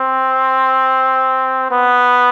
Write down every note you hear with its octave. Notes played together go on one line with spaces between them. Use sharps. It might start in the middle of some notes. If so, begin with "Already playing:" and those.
Already playing: C4
B3